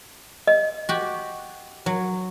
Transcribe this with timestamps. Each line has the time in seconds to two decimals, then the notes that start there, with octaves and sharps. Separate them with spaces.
0.47 D#5
0.89 F#4 G4
1.86 F#3